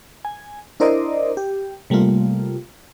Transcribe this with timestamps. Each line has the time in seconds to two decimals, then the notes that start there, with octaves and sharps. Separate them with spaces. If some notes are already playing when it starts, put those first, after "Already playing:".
0.25 G#5
0.80 D4 E4 A#4 C5 D5 D#5
1.37 G4
1.90 C3 G3 A3 A#3 F4